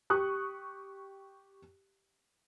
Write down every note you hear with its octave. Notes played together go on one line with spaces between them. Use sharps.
G4 C#6 D#6 F#6